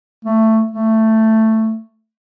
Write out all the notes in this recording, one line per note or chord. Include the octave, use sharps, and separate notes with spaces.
A3
A3